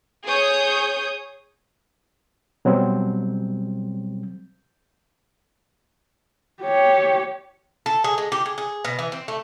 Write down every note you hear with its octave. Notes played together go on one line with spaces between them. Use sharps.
G#4 C#5 D#6 G6
B2 F#3 G3 C4
G4 C#5
A4
G#4
G#3
G4
G#4
G#4
B2
E3
C4
A3